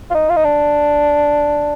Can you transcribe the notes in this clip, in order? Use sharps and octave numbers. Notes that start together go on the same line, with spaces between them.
F4
D#4
F4
D#4
D4